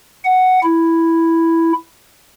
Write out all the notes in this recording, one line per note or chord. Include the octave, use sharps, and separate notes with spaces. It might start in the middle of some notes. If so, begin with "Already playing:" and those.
F#5
E4